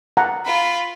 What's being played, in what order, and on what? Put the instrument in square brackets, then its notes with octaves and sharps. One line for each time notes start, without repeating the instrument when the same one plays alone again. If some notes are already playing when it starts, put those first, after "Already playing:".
[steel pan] F#5 A5 A#5
[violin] F4 B5